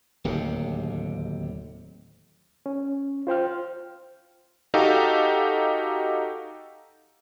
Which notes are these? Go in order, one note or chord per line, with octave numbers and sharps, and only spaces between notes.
D1 D#2 C3
C#4
F4 C5 G5 F6
D#4 F#4 G4 A4 F5